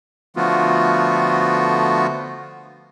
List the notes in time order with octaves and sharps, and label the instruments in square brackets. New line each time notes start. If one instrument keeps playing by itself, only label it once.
[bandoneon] D3 F3 A3 B3 F4 F#4